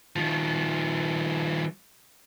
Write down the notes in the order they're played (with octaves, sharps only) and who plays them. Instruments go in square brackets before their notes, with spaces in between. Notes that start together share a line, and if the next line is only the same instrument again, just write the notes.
[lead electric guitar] D#3 F3